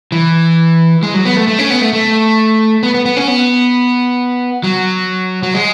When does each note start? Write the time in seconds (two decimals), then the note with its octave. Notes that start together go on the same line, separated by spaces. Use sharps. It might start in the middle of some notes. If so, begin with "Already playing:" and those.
0.12 E3
1.03 G#3
1.14 F#3
1.25 B3
1.37 A3
1.48 A3
1.59 C#4
1.70 B3
1.81 A3
1.93 A3
2.83 B3
2.94 B3
3.05 B3
3.17 C#4
3.27 B3
4.63 F#3
5.43 F#3
5.54 G#3